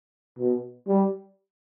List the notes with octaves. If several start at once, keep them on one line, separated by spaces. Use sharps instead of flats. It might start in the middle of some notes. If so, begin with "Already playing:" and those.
B2
G3